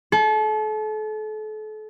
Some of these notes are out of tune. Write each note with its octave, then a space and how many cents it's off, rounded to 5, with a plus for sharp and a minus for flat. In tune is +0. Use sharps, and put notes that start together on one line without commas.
A4 -35